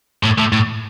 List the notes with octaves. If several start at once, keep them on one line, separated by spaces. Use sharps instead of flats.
A2
A2
A2